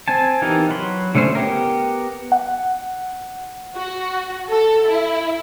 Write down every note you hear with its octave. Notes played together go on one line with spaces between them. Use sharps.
C4 G#5 A5
E3 B3 D#4 G4 A#4
F#3 B5 C6
D3 A3 C#4 E4 C5
B3 G4 A#4
F#5
F#4
A4
E4